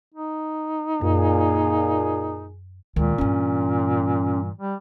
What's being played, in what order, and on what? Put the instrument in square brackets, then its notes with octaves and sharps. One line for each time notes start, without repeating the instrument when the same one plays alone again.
[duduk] D#4
[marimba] F#2 [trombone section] A#2 G#4
[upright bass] D2 G#3 [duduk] A#2 [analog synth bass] D#3
[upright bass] G2 E3 [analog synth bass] C#4
[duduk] G3